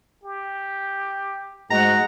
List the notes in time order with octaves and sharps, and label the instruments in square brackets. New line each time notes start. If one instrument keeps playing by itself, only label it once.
[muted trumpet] G4
[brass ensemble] G#2 F#4 D#5 [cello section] G#3 [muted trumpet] F#5 [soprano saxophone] A#5